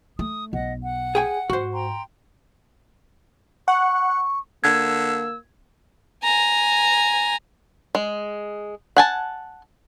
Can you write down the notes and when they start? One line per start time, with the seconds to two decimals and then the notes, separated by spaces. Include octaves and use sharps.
0.19 A3 D#6
0.53 B1 D#5 F#5
0.83 F#5
1.15 G#4 G5 G#5
1.50 G#2 F#4 C5
1.72 G5 A#5 C6
3.68 F#5 C#6
4.64 D3 A#3 E6 G#6
6.24 G#5 A#5
7.95 G#3
8.97 F#5 G#5 A5